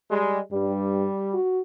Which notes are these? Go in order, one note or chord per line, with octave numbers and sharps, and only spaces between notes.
G3 G#3
G2 G3
F#4